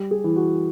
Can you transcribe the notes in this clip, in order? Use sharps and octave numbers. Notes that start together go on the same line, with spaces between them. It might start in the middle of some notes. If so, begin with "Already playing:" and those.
Already playing: G3 G4
G#4
E3
F#4